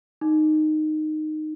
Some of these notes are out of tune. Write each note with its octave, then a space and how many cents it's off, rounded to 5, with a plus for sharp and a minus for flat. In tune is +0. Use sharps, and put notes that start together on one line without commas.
D#4 -15